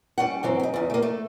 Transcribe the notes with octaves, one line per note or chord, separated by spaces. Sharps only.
G3 C#4 F#5
G2 E3 F#3 C4
C#4 D#4
E2 C#3
A3 A#3
A3